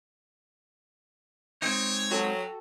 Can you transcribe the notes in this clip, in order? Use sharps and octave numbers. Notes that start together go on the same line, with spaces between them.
G#3 C4 D#4 C#5
F#3 F#4 A4 G5